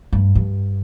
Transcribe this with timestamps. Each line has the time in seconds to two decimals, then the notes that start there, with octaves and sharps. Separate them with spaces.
0.13 G2
0.35 G2